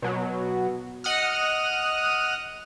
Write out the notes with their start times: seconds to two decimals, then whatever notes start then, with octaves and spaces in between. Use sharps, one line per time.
0.02 B2 F#3
1.04 D#5 F#5 D#6 F6